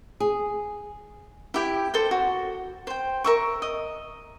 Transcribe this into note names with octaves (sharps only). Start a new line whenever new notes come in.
G#4
E4 G4 G5
A4 C5 G5
F#4
C5 G5
A#4 E5 C#6
D#5